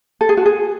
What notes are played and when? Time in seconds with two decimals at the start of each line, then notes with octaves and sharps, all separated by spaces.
0.21 A4
0.29 G#4
0.37 F#4
0.46 G#4